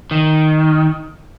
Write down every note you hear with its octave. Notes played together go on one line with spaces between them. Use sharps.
D#3